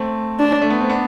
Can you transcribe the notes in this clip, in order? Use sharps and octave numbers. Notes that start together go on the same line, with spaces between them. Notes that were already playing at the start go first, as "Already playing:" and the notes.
Already playing: A3 C4
D4
A3
B3
C4
B3 D4